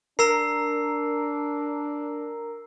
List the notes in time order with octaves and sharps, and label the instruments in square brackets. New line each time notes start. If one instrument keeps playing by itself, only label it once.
[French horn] D4 [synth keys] A#4 [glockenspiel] A#5 E6 C7